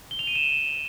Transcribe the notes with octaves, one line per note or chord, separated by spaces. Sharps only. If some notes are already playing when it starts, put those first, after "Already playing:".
G7
F7
D#7
E7